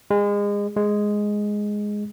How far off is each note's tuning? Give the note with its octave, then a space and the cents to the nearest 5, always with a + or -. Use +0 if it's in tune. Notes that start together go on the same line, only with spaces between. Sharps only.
G#3 -30
G#3 +0